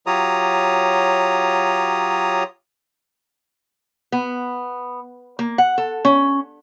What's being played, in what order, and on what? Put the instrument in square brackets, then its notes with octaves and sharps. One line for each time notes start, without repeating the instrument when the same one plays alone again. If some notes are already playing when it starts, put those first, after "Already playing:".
[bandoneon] F#3 F4 G4 C#5 A#5 D#6
[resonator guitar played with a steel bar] B3
A#3
F#5
A4
C#4